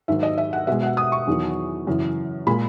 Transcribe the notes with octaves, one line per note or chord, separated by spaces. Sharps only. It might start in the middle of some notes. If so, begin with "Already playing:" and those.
G#2 D#3 F#3 E5
D#5
E5
F#5
B2 G#3 E5
F#5
D#6
C#6
E2 D#3 F#3
F#2 C#3 E3
A#2 G#3 B5